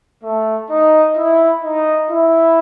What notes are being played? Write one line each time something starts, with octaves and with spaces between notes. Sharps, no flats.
A3
D#4
E4
D#4
E4